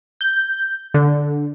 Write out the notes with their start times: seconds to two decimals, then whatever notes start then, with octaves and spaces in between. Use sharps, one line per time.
0.21 G6
0.94 D3